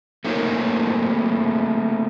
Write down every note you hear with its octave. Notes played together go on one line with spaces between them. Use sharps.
A3 A#3 C4 D#4 A#4 C#5